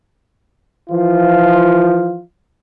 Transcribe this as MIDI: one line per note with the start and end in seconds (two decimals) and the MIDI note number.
0.90 2.21 52
0.90 2.21 53
0.90 2.21 65